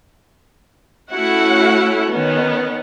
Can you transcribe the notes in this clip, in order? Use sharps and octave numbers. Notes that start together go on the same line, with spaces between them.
A3 C#4 E4 F#4 F#5
D#3 B3 C#4